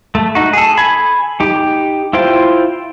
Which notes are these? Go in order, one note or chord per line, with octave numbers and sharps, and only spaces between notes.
A3
D#4 F#4
G#4 A4
G#5 B5
D#4 G4
E4 F4 C5 G5